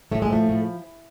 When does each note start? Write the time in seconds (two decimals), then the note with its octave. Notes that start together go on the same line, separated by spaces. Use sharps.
0.12 A2 A3
0.22 G#3
0.30 F3 A3
0.49 A2